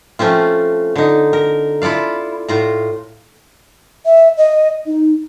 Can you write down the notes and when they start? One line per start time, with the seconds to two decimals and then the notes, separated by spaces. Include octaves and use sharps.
0.19 F3 A3 C4 C#4 F4
0.96 D3 D#4
1.33 A#4
1.82 E4 F4 A4 D5 F5
2.48 A2 F4 A#5
4.06 E5
4.37 D#5
4.87 D#4